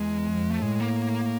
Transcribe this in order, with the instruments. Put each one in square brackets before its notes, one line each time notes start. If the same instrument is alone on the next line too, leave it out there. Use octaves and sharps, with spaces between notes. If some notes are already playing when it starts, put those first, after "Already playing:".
Already playing: [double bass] E2 [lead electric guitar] G#3
[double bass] F2
[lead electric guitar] A3
[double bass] A2 [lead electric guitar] G#3
[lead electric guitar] A#3